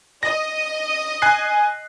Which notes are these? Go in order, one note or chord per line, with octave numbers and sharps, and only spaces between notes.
D#5 A#6
G#5 F#6 C7